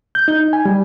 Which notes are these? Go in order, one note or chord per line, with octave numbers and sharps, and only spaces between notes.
G6
D#4
G#5
G3